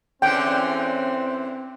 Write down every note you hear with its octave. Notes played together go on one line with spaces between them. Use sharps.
E2 D3 E3 C4 C#4 G5